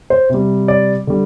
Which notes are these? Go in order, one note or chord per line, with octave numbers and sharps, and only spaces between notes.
C5
C3 G3
D5
D3 G3